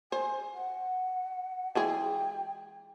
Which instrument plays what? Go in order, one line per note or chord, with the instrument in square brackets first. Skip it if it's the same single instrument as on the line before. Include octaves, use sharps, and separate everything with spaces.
[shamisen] C5 [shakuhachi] G#5
[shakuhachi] F#5
[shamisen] E3 G#3 G#4 [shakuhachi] G5